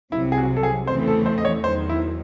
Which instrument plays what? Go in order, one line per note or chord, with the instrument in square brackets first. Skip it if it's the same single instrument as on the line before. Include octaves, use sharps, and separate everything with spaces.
[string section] C2 C3 F#3 [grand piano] E4
[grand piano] G#4
F#4
A4
G#4
[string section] E2 C#3 E3 A3 C4 [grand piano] C5
[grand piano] A4
C5
D#5
C#5
[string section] E2 D#3 F#3 [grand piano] C5
[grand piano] E4